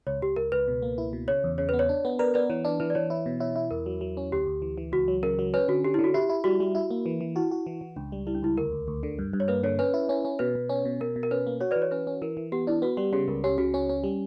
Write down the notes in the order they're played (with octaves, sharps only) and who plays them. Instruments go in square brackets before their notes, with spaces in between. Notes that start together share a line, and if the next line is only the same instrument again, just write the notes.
[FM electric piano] C#2 [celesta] C#5
[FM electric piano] C#2 [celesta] G4
[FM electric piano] C#2 [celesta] A#4
[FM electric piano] C#2 [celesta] B4
[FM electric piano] B2
A#3
E4
B2
[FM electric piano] C#3 [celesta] C#5
[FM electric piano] E2
[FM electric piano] C#3 [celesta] C#5
[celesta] B4
[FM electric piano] B3
[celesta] C#5
[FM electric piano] D4
B3
[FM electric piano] A#4 [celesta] B4 D5
[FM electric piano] B3 [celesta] B4 D5
[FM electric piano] E3 [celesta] C#5
[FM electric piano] D4 [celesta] B4
[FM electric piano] E3 [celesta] B4
[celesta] D5
[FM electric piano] E3 [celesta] C#5
[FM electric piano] E4 [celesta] C#5
[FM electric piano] B2
[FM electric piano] E4 [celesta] C#5
[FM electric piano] E4
[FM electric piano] E2 [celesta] A#4
[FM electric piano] F#3
F#3
C#4
[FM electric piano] D2 [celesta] G4
[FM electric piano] D2
E3
E3
[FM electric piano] C#2 [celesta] F#4
[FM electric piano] F#3
[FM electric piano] C#3 [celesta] A#4
[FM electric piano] F#3
[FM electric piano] C#4 [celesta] B4
[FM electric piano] D3 [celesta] F#4
[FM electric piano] D3 [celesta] G4
[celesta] E4
[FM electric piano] D3
[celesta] F#4
[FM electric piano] E4 [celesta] G4
[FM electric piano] E4
[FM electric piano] G3 [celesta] F#4
[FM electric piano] G3
E4
A#3
E3
E3
[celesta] E4 [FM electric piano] F#4
[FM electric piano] F#4
E3
E3
[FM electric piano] C#2 [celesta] D4
[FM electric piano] G3
[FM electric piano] G3 [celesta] E4
[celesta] D4
[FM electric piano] C#2 [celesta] E4
[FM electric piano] D2 [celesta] A#4
[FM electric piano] D2
D2
D3
G2
G2
[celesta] C#5
[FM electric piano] A#3 [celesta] B4
[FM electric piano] D3 [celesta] C#5
[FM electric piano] C#4 [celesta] B4
[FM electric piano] E4
C#4
C#4
[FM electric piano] B2 [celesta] B4
[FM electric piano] B2
C#4
B2
[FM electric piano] B2 [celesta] A#4
[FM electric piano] B2
[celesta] A#4
[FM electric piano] C#4 [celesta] B4
[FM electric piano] A#3
[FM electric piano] F#4 [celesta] C#5
[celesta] B4 D5
[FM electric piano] E3
[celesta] C#5
[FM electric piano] C#4 [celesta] B4
[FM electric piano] C#4
[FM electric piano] E3 [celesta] A#4
[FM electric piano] E3
[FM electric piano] B3 [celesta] G4
[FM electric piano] D4 [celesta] E4
[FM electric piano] B3 [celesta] F#4
[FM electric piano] G3 [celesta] G4
[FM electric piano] C#3 [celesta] G4
[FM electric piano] C#2 [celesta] A#4
[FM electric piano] C#4 [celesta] G4
[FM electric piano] C#3 [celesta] F#4
[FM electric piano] C#4
C#4
G3